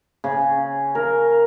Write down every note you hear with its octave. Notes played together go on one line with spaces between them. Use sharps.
C#3
A#4